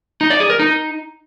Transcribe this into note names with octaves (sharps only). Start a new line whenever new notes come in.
D#4
D5
G#4
A#4
D#4